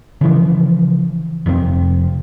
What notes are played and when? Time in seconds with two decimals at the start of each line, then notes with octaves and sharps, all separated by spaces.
0.21 C#3 E3 F3
1.46 F1 F2 C3 C4